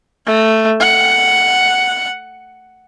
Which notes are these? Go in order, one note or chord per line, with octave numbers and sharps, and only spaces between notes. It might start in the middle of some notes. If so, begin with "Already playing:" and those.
A3
F#5